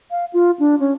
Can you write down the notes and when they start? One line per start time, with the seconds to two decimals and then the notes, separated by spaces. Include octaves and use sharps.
0.11 F5
0.33 F4
0.59 D4
0.80 C#4